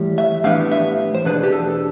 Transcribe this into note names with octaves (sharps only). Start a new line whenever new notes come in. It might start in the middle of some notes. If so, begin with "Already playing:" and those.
Already playing: A2 E3 G3
E5
A2 E3 G3 B3 D4 F5
E5
C5
E2 B2 B3 D4 B4
G4
A4